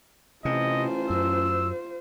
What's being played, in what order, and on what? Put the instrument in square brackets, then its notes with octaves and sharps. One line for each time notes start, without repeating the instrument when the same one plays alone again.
[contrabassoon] A1 [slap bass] C3 [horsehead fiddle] F4 C5 [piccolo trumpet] D#5
[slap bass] F#2 [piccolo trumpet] E6